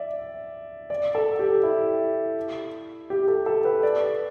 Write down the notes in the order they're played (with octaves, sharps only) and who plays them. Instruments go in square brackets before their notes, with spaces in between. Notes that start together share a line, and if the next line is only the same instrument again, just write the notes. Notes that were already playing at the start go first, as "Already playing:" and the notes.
Already playing: [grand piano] D5 E5
D5
A4
G4
E4
G4
A4
A4
B4
D5